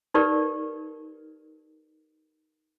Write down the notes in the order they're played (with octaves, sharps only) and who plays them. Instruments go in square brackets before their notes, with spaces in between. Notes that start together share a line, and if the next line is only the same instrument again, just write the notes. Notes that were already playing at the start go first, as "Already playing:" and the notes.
[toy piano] D#4 G4 A#4 B4 D5